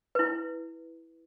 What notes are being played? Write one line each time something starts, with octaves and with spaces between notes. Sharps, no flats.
E4 B4